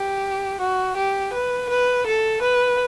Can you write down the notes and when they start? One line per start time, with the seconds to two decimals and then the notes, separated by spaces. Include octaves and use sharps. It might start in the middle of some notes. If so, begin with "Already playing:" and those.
Already playing: G4
0.60 F#4
0.97 G4
1.33 B4
1.70 B4
2.07 A4
2.42 B4